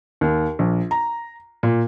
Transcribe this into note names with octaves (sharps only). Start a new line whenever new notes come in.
D#2
A#1
A#5
A#2